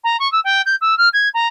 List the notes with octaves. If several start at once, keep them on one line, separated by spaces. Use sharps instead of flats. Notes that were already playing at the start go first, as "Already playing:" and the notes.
A#5
C#6
E6
G5
G6
E6
F6
G#6
A#5